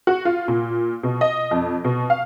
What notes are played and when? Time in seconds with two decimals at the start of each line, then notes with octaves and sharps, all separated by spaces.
0.07 F#4
0.25 F4
0.48 A#2
1.03 B2
1.21 D#5
1.51 F2
1.84 B2
2.10 F5